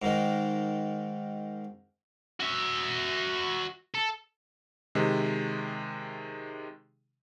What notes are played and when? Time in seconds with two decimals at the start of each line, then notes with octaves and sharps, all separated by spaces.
0.02 G#2 D#3
2.40 F#4 E5
3.95 A4
4.95 C3 D#3 G#3